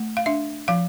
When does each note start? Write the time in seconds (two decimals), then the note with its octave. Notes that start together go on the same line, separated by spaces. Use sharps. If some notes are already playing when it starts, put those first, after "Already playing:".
Already playing: A3
0.17 F5
0.26 D4 E5
0.68 F3 F5